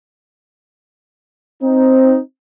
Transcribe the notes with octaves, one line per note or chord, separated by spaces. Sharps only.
C4 D#4